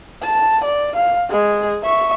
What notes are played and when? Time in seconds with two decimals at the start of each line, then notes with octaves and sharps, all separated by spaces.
0.23 A5
0.64 D5
0.96 F5
1.30 G#3 G#4
1.83 E5 C#6